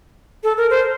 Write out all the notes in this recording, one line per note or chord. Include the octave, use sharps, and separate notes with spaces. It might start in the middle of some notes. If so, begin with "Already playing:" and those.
A4
A#4
C5